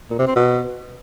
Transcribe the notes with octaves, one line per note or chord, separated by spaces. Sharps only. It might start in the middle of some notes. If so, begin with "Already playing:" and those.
A#2
C3
C4
B2